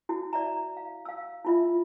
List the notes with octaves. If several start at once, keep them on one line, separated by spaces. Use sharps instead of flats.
E4 F#4
D5 E5 A#5
F5
F5 E6
E4 F4 E5